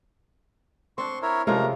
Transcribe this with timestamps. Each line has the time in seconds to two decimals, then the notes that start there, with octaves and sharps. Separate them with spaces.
0.98 C4 D4 C6 C#6
1.22 E4 A#4 C#5
1.47 C3 F3 G#3 A3 C#4 A#4